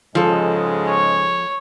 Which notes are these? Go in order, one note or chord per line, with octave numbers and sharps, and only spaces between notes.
G#2 C#3 F3 G#3 A4
C#5